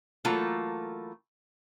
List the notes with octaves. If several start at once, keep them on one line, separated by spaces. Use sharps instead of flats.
E3 F#3 A3 A#3 F4 A4